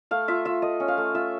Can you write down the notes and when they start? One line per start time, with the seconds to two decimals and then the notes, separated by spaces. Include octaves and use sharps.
0.11 A3 F5
0.28 F4 E5
0.45 F4 E5
0.62 A3 D#5
0.80 C#4
0.88 F5
0.98 A3
1.15 F4 E5